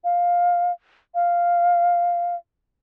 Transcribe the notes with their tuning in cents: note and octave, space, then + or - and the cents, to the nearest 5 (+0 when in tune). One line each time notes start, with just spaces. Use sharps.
F5 +10
F5 +0